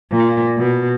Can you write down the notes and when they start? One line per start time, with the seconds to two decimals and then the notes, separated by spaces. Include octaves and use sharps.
0.12 A#2
0.58 B2